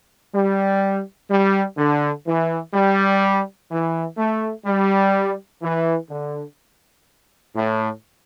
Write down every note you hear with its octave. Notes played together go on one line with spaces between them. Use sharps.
G3
G3
D3
E3
G3
E3
A3
G3
E3
D3
A2